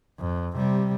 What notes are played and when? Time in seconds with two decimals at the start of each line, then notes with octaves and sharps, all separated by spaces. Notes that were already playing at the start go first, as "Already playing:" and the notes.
0.20 F2
0.56 C3 G3